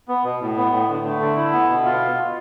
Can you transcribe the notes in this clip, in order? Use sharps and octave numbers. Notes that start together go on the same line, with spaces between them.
B3
B2
A2
B3
A2
D3
A3
D3
E4
B3
B2
F4